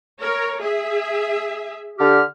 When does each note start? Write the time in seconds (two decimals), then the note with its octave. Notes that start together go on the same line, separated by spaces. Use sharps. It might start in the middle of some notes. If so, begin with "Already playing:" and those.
0.21 A#4 C#5
0.61 G#4 E5
1.99 D3 G4 F6